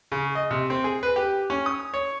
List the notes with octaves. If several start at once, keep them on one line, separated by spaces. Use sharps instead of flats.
C#3
D#5
C3
C4
G#4
B4
G4
C#4
D#6
C#5